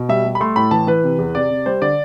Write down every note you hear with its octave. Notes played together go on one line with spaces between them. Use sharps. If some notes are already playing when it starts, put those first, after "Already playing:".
Already playing: B2
G3 E5
G3
B5
A3 C6
A2 B5
E3 A5
E3 B4
C3
E2
C3 D5
C3
G3 C5
D3 D5